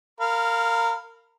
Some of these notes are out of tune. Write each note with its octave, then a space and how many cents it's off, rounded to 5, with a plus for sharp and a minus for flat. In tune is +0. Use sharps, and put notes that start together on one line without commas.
A#4 -20 F5 +0 B5 +0